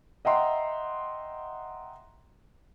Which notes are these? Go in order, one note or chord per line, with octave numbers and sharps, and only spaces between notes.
D#5 E5 F#5 G5 A#5 C6